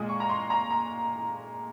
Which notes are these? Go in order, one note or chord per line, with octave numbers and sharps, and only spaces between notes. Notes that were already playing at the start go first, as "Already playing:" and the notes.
Already playing: A#2 G#3 D#6
C#6
A#5
C6
A#5
A#5